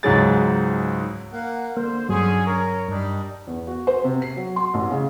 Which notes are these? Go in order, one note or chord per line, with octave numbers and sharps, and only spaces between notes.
C#2 G#2 F#3 G#4 A6
A#3 F#5
D3 A#3 C5
G2 D3 F#3 C#4 G#4
C#4 A#4 C#5
G2 G3 D4 D#4
E2
F#4
C5
C3
C7
F#3
C6
A1
C#3